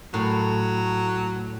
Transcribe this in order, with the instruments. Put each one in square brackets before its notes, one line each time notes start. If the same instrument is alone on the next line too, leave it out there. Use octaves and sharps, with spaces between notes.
[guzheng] A2 [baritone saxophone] F#3